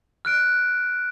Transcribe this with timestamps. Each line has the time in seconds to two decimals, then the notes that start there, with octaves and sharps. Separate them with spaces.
0.25 F6 F#6 D7